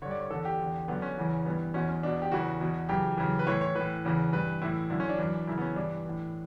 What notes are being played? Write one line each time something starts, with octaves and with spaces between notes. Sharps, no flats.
G2 D3 C#5
D5
C#5
E2 D3 A4
G4
E2 D3
F#2 D3 B3
C#4
E2 C#3 E3
G2 E3 B3
E2 B2 C#4
C#4
E2 B2 D4
G4
E2 C#3 E3 F#4
E2 B2
F#2 C#3 E3 G4
F#2 C#3 E3
B4
A2 E3 C#5
C#5
A2 E3 B4
E2 C#3 E3
G2 E3 B4
A2 E3 E4
F#2 D3 E4
C#4
D4
F#2 E3
F#2 C#3 E3 E4
B3
C#4
G2 E3 D4
A2 E3